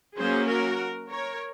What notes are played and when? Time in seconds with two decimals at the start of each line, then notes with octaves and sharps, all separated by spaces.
0.18 F#3 A#3 C#4 G#4 C5
0.48 F#4 A#4
1.10 A#4 C#5